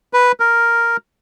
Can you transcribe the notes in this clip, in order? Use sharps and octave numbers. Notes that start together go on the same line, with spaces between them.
B4
A#4